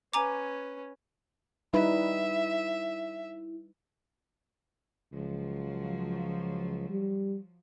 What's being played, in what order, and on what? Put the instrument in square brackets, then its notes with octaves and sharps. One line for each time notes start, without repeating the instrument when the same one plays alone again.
[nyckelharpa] C#4 B4 [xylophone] G#5 A#5 D6
[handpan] G3 D#4 B4 [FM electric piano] E4 [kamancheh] E5
[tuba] C#2 [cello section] F3 F#3
[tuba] G3